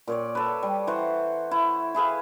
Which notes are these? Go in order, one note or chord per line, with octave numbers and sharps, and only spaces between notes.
A#2 C#5 D5
A4 B4
G3
E3 C5 F#5 C#6
E4
E4 G#4 B4 F5